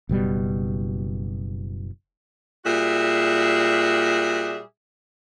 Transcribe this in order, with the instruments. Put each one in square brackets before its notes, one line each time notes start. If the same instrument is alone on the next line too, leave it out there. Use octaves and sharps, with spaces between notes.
[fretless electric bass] F#1 B2 G3
[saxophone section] A#2 G3 F#4 G#4 E5